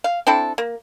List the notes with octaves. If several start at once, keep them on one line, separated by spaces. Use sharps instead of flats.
F5
C4 D4 E4 A4
A#3